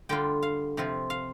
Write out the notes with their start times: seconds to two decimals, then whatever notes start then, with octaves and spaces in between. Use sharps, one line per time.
0.09 D3 G3 D4 F4 G5
0.42 F5
0.77 C3 F3 C4 F4
1.10 F5